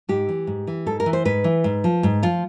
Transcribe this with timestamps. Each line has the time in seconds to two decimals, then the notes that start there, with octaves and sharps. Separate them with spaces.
0.09 G#2 G4
0.29 E3
0.47 G#2
0.67 E3
0.86 G#2 A4
1.00 A#4
1.06 E3
1.13 C5
1.25 G#2 B4
1.44 E3
1.64 G#2
1.84 F3
2.03 G#2
2.23 F3 F4